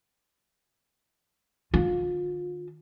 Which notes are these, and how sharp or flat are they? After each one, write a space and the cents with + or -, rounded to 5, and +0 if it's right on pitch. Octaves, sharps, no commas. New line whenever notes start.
D#3 -40 F4 +30